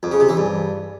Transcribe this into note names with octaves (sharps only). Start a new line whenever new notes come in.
F2
C#3
C3
E3
G2